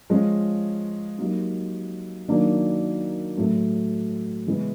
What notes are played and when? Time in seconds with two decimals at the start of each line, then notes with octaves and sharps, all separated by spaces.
0.10 F3 G#3 C#4 F4
1.18 F#3 A#3 D#4 G4
2.28 D#3 F#3 A#3 D4
3.37 A2 F#3 A3
4.46 C#3 E3 G#3 B3 E4